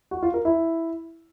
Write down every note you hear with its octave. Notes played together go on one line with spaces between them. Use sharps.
F#4
F4
A#4
E4